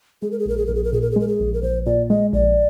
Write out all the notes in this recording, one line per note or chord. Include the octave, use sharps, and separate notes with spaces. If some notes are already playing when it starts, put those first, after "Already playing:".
G#3 G#4
A#4
G#4
A#1 A#4
G#4
A#1 A#4
G#4
A#4
A#2 G#4
A#4
G#4
G#3 A#4
G#4
A#1
A#4
A#1 C5
A#2 D5
G#3 D#5
A#1 D5